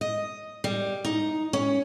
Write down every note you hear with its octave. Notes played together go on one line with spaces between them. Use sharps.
D#5
G3
D#4
C#4